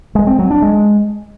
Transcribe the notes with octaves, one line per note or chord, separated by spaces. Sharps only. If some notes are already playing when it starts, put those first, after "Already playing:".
G#3
C4
F#3
D4
G#3